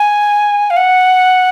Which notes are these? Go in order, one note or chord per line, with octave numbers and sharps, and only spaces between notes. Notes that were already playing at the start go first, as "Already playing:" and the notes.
Already playing: G#5
F5
F#5